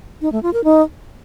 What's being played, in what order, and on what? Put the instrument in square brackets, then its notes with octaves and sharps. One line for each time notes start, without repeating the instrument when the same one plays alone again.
[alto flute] D#4
A3
F4
A#4
D#4